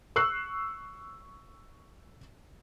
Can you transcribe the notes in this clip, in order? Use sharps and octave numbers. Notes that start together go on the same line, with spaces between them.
C#6 E6 F#6 C7